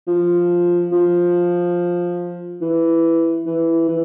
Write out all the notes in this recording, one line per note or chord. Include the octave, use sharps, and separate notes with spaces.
F3
F3
E3
E3
E3